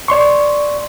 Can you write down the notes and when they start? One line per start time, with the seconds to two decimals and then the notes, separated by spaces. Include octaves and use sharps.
0.08 D5 C6 C#6